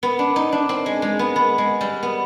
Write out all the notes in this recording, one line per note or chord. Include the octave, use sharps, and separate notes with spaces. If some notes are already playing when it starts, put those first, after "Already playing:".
B3
D4
D#4
D4
C4
G#3
G#3
B3
B3
G#3
G3
B3